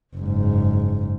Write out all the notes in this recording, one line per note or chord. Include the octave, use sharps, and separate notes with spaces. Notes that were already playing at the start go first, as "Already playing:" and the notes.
F#1 G#2